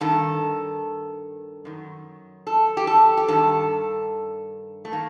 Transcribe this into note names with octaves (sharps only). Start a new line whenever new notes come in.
G2 D#3 A4
F#2 D#3
A4
G4
A4
G4
G2 D#3 A4
A3
D#3 A#3